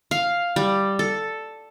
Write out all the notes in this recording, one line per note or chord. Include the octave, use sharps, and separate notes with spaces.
F5
G3
A4